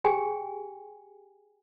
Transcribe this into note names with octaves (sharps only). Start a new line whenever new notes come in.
G4 G#4 G5 G#5